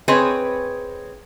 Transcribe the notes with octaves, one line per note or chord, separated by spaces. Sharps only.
C4 G#4 B4 C#5 D#5